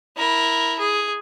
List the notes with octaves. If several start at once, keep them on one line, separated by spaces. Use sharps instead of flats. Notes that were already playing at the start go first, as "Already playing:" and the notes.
E4 A#4
G#4